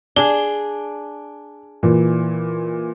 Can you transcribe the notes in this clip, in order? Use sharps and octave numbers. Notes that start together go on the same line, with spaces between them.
D4 G#4 G7
A#2 E3